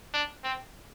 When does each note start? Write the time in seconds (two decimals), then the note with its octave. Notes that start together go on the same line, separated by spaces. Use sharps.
0.13 D4
0.44 C4